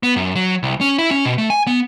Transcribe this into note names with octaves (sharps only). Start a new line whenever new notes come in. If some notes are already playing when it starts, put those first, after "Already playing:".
B3
F#2
F#3
C2
C#4
E4
C#4
B2
A3
G#5
B3